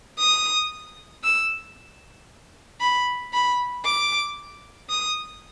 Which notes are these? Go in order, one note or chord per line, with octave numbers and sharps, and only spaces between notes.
D#6
E6
B5
B5
D6
D#6